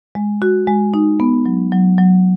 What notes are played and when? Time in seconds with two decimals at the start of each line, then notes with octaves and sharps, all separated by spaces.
0.15 G#3
0.42 F#4
0.68 G#3
0.94 D#4
1.20 B3
1.46 F#3
1.72 F#3
1.98 F#3